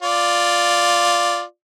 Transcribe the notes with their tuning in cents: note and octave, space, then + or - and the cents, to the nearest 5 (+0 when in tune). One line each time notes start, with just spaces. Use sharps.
F4 +0 D5 +0